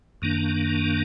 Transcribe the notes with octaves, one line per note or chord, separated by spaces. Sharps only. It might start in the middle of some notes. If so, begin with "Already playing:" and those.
F#2 D#3 A#3 D4